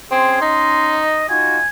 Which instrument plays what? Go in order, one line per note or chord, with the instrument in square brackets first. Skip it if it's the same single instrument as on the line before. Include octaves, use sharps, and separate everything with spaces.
[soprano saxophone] C4 [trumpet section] C#4 C6 [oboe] G#4
[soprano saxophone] D#4 [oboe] D#5
[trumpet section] D#4 F4 F#4 [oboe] G#5